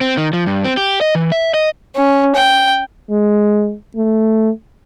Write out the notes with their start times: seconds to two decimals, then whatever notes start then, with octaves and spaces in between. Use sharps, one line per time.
0.01 C4
0.17 D#3
0.33 F3
0.46 G2
0.65 C4
0.77 G4
1.01 D#5
1.15 E3
1.32 E5
1.54 D#5
1.95 C#4
2.36 G5
3.10 G#3
3.96 A3